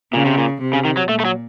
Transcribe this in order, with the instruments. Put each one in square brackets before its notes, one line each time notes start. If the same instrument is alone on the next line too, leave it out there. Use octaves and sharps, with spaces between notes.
[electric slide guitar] A#2 [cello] C#3
[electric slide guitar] C3
A#2
[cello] C3
[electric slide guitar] C#3
D#3
F#3
[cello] A#2 [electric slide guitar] A3
[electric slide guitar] A3
F#3